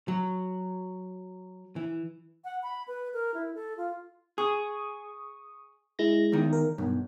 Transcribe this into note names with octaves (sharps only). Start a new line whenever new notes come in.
F#3
E3
F#5
B5
B4
A#4
E4
A4
F4
G#4 C#6 D#6
G#3 E4 A#6
E2 D#3
A#4
B1 G2